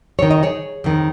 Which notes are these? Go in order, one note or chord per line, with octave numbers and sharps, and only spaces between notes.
F2 D#3 C#5
D#5
G#4 C#5
F2 D#3